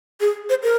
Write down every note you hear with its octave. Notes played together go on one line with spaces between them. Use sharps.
G#4
C5
A#4